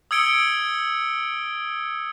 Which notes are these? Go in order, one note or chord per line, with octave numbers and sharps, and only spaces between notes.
D#6 E6 G#6 C#7 D7 G7